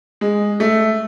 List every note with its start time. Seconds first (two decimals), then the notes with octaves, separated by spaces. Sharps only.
0.21 G#3
0.60 A3